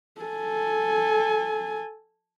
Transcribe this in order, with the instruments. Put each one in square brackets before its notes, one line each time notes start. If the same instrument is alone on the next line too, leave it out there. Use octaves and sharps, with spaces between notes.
[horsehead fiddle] A4 G#5